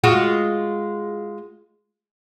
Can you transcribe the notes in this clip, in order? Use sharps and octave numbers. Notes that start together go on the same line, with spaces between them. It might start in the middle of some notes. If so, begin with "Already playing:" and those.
G#3 F4 F#4